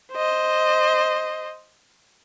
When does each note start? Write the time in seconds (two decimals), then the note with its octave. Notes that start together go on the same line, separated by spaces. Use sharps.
0.12 C5 D#5